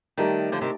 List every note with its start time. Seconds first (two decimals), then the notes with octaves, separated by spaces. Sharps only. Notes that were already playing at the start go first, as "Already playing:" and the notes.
0.17 D#3 G3 A3 D#4 G4 D5
0.52 D3 F3
0.61 C3 D#3